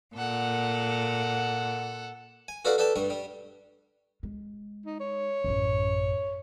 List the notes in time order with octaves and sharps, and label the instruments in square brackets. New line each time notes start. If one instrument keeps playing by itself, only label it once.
[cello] A#2 [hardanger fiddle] A4 F#5
[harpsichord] G#5
F#4 A4 B4 D5 F5 F#5
A4 B4 D5 G5 A5
G2 G3 C#6
G3
[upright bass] G#3
[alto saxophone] D#4
C#5
[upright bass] A1 F#2